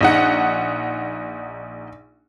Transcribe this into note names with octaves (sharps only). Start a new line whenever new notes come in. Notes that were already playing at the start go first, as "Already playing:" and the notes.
A#1 D#4 F#5